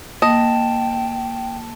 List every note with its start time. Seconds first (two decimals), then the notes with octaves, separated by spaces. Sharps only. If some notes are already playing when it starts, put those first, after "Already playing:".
0.22 A#3 D#5 G5 A5